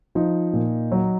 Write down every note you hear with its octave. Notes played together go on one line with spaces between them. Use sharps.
F3 D#4
A#2
F#3